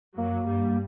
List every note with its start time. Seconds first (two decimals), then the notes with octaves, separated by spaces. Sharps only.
0.17 F#2 F#3 A#3
0.47 G2 G3